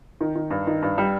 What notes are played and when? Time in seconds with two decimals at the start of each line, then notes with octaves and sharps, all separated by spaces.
0.21 D#3
0.35 D#3
0.50 G2
0.67 D#3
0.82 G2
0.98 G3